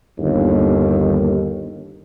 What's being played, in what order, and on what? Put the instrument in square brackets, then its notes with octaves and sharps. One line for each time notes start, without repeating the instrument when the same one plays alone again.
[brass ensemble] G1 D#2